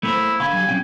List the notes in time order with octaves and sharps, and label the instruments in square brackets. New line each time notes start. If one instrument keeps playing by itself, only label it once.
[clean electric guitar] A3 A#3 C5 [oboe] E4
[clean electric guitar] D3 F5 B5 [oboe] G#5
[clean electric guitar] F#3 G3
C2 C#4 G5